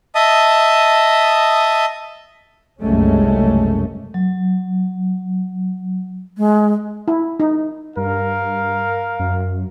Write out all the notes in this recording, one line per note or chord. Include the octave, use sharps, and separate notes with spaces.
D#5 E5 A5 D#6
F#1 C2 F#2 G#3 A3 C#4
F#3
G#3
E4
D#4
G2 A#4 F5
F#2